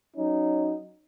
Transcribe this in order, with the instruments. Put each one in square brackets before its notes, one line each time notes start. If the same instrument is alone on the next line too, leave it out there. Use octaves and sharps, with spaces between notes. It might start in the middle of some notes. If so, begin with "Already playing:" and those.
[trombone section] F#3 C#4 D#4